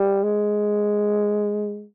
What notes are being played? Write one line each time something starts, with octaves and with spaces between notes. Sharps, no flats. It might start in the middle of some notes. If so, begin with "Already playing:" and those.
Already playing: G3
G#3